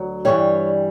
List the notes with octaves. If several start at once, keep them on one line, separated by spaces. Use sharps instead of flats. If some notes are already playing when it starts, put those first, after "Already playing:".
Already playing: D2 F#3
G2 E3 G3 C#5